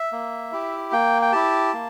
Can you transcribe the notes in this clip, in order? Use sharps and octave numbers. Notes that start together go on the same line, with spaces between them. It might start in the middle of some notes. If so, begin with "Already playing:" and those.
Already playing: E5
A#3
E4 G4
A#3 G5
G5
E4 G4 A5
A#3